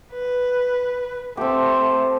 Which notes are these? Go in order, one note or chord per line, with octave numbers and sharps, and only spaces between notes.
B4
A3 C4 G4